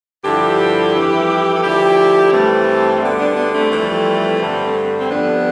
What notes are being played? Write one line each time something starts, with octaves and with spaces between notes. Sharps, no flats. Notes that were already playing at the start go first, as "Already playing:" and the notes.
G2 D3 F3 E4 G4
F2 E3 G3
A4
D2 D3 F3 E4 G4
G2 E3 G3 A3 C4
D2 D3 G3 B3
B3 D4
B3 D4
A3 C4
F2 E3 G3
G2 D3 G3
C4
F2 D3 G3 B3 D4